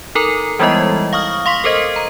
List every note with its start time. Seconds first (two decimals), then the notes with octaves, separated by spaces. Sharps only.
0.15 D#4 A4 A#4 A#5
0.59 E3 G3 G#3 B3 E4 D#5
1.13 F5 C#6 D#6 F6
1.46 F5 C6 C#6 B6
1.64 A4 A#4 C5 D#5
1.96 A#5